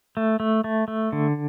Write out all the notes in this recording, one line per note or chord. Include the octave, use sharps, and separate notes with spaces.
A3
A3
A3
A3
D3